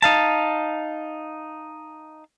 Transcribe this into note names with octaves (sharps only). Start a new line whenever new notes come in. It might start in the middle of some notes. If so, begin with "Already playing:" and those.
D#4 F5 A5